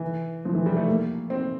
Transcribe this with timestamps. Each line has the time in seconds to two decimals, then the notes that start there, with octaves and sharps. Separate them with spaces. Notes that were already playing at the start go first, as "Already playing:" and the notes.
Already playing: E3
0.45 F3
0.55 E3
0.66 G3
0.77 A3
0.88 A#3
1.30 C4